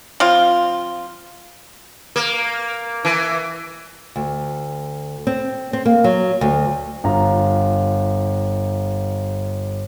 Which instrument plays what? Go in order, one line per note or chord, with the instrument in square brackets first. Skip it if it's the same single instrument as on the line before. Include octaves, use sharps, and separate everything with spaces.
[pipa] F3 C4 F4
[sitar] A#3
E3
[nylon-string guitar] D2
C4
C4
A#3
F#3
D2
[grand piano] G1 F4 A#5